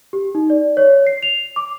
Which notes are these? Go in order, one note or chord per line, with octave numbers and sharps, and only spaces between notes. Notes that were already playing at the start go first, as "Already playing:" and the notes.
G4
D#4
D5
C#5
C7
F7
D6